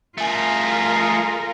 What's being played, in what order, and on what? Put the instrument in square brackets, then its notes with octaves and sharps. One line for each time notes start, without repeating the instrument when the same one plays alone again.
[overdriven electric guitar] A3 G#4 [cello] F4 A#4